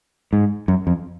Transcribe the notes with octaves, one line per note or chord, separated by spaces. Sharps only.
G#2
F#2
F2